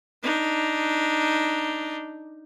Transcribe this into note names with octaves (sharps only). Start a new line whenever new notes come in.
D4 D#4